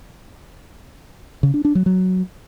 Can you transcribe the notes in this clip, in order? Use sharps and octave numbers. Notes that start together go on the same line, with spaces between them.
C#3
D4
D4
F#3
F#3